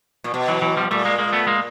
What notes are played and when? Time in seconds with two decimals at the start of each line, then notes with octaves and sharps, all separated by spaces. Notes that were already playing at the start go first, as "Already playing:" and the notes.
0.24 A#2
0.34 B2
0.48 E3 F#3
0.62 E3 F#3
0.77 F3 G3
0.91 A#2 G3 A3
1.05 G#3 A#3
1.19 G#3 A#3
1.33 A3 B3
1.47 G#3 A#3